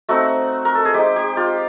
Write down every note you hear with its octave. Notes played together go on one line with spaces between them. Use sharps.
A3 C4 D#4 F#4
A#4
A4
G#4
G#3 C4 D#4 G4
G4
F4